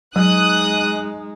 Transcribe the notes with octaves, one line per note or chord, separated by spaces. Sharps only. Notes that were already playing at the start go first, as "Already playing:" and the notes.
F#3 G#3 D#4 D#6 F#6